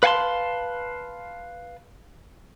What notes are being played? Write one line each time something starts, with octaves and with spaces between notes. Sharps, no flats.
B4 F5 F#5 G#5 A5 C6